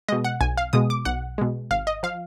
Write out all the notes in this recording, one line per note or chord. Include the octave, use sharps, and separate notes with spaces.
B2 G#3 D#5
F#5
B1 G#5
F5
B2 G#3 D#6
D6
B1 F#5
B2 G#3
G#1 F5
D#5
F3 F5